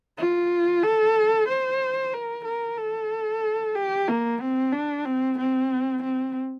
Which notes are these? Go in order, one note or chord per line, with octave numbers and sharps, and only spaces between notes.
F4
A4
C5
A#4
A#4
A4
G4
A#3
C4
D4
C4
C4
C4